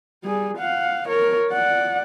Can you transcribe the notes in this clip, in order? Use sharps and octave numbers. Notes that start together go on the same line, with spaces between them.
G3 G#4
F5 F#5
A#4 C#5
D5 F#5